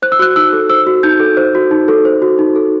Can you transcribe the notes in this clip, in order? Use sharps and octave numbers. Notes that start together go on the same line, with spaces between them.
C5 F#6
E6
F#4 F#6
D#4 E6
A4
C5 E6
F#4
D#4 G6
A4
C5
F#4
D#4
A4
C5
F#4
D#4
A4